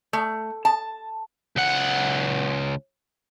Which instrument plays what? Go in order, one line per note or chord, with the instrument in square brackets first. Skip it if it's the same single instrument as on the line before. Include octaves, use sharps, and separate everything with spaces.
[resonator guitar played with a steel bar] A3
A5
[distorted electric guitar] C#2 F#5